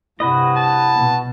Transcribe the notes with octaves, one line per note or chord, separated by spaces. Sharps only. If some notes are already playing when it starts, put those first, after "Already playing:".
G2 C3 E4 F#4 B4 D#5
A5
B2